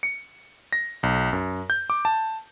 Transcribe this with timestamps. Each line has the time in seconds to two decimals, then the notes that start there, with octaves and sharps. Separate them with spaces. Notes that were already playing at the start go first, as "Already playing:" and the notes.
0.03 C#7
0.73 A#6
1.03 B1
1.33 F#2
1.70 G6
1.90 D6
2.05 A5